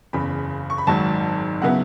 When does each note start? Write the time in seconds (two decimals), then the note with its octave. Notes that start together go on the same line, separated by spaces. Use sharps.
0.13 F#1 E2 C#3 B5
0.70 C#6
0.78 B5
0.87 G#1 G#2 F#3 A5
1.62 C#3 F#3 B3 E4 F#5